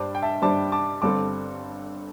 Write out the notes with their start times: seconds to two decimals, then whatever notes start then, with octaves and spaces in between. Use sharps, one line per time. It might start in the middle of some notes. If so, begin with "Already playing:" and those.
Already playing: G2 G3 D4 C5 A5 D6
0.15 G5
0.22 E5 A5
0.42 G2 G3 D4 C5 A5 D6
0.72 A5 D6
1.02 G1 G2 G3 C4 A4 A5 D6